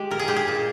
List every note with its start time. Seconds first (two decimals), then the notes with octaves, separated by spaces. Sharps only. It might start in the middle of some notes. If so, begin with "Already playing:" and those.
Already playing: G#3 G4
0.11 A#2 A#4
0.19 G#4
0.28 G#3 G4
0.36 G#4
0.48 A#2